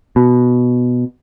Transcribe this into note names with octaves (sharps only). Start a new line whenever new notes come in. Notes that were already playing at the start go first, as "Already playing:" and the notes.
B2